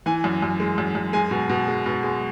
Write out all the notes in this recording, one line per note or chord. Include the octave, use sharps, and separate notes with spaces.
E3 G#5
F#2
F#2
G#3
F#2
F#2
G#3 G#5
B2
B2
G#3
B2
G#3